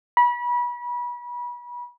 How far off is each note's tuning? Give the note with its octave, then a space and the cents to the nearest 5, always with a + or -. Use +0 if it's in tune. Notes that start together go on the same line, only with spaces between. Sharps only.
B5 -30